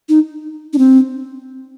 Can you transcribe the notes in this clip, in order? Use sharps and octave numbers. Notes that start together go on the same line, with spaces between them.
D#4
D4
C4